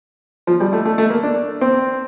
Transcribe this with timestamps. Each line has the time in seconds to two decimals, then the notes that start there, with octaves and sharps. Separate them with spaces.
0.47 F3
0.60 G3
0.73 A3
0.85 A3
0.98 A3
1.10 A#3
1.23 D4
1.61 C4